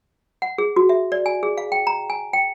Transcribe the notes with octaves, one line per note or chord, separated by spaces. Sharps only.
F#5
G#4
F#4
E5
D5
G#5
G#4
F5
G5
A#5
G#5
G5